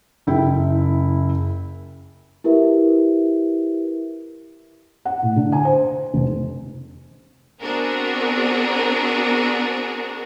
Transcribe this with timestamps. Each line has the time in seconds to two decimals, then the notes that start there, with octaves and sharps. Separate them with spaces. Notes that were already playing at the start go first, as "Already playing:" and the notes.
0.27 F#1 E4 G5
2.44 E4 G4 A#4 B4 E5
5.05 F#5
5.22 A2
5.36 D3
5.52 G#5
5.65 C5
6.14 F1
7.61 B3 C4 D4 F#4 G#4 A#4